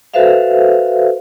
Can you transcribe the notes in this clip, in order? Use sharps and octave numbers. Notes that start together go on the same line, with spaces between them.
F#4 A4 B4 C5 E5 F5